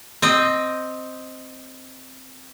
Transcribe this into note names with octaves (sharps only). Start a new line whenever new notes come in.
C4 D#5